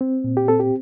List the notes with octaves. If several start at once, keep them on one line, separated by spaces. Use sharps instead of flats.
C4
A#2
G4
C4 A4
G4